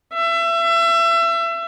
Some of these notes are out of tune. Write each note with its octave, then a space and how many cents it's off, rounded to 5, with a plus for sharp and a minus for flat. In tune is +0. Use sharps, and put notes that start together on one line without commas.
E5 +30